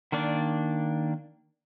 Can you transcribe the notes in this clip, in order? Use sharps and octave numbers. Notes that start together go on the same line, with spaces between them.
D#3 A#3 D4 D5